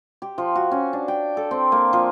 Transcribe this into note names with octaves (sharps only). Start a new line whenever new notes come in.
G4
F3
F#4
C#4
D4
G5
A4
C4
A#3
F3